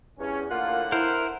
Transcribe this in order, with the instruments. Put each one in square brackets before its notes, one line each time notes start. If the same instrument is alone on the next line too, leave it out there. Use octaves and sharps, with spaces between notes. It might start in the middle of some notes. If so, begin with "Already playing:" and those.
[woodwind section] E2 [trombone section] G2 C#4
[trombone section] A2 D3 [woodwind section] A#3 F4 [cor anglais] F#5
[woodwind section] E4 [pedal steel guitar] A#4 C5